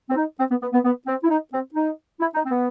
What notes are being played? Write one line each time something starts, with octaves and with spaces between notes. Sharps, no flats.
C4
D#4
C4
B3
B3
B3
B3
C4
E4
D#4
C4
D#4
E4
D#4
C4
B3